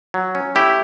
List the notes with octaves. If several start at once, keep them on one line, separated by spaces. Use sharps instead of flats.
F#3
C#4
A3 E4 G4